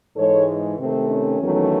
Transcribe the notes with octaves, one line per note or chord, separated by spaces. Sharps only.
G#2 E3 G#3 A4 C#5
C3 D#3 A3 C4
C#4
E2 D#3 F#3 A3